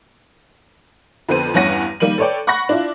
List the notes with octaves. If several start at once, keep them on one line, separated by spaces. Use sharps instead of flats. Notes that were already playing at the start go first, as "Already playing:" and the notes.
F2 D3 B3 C5 D#7
E2 G2 C#4 F#5 A#6 D#7
D#3 G3 A#3 D#7 F#7
A4 B4 C#5 D5 G5
F#5 B5 C#6 F#6 A#6
D4 E4 F4